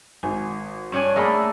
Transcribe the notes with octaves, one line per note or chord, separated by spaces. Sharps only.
G#1 G#5
G2 C#4 D4 C#5 G#5
A3 A#3 G#4 A#4 E5 F#5 A5 B5